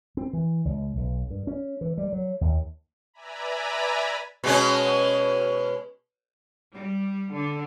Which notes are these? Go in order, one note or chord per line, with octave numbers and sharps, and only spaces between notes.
C4
E3
C#2
B1
G2
C#4
E3
G3
F#3
D#2
B4 D5 E5 G#5 A#5 B5
B2 G#3 C#4
G3
D3